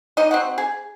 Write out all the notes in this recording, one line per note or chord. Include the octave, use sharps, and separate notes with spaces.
D#4 D#5
C4 F#4 F#5
G#4